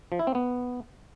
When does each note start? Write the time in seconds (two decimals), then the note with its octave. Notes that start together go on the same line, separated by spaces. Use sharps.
0.12 F3
0.19 E4
0.27 C4
0.35 B3